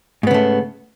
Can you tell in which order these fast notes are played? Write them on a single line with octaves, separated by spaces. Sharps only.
G#2 B3 C#3 A3